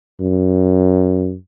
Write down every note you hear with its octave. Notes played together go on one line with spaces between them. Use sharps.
F#2